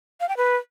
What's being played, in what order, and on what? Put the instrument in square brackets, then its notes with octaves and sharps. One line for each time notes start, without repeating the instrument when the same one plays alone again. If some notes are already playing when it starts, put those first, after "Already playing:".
[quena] F5
G5
B4